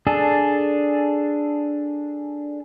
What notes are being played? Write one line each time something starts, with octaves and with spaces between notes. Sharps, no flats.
D4 G#4 A4